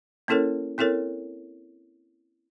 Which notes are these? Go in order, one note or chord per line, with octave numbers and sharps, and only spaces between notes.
A#3 C#4 E4 A4 A#4 C#5
C4 E4 A4 A#4 C#5